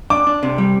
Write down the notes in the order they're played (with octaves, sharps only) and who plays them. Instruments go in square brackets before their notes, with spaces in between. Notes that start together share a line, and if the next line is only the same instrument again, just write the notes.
[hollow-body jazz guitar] D4 [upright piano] D6
[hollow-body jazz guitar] D4
C3
G3